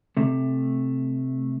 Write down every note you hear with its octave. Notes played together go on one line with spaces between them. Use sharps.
C3 A3